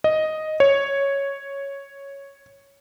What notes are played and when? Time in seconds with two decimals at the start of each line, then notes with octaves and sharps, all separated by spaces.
0.04 D#5
0.60 C#5